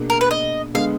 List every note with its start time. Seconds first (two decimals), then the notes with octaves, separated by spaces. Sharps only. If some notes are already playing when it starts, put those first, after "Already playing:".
Already playing: B2 A#3 D4 G#4
0.10 A#4
0.21 B4
0.31 D#5
0.74 D3 G#3 B3 F5